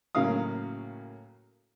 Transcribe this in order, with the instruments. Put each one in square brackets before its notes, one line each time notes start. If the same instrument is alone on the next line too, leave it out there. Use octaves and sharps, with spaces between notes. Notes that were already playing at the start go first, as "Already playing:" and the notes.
[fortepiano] A2 C#3 F#3 A#3 F5 D#6